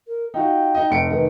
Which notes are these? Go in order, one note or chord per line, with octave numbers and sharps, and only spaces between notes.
A#4
D#4 F4 F#4 G5
D#4 D#5
F1 C#7 D7
F1 D#3 B4